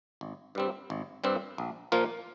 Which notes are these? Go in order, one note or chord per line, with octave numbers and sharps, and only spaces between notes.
G#1
G2 G3 C4
G#1
G2 G3 C4
A#1
A#2 F3 A#3 F4